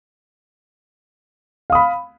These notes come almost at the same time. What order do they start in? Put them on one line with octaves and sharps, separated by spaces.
F5 D#6 B5